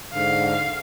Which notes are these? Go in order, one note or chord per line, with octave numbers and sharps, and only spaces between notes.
G#2 D3 F5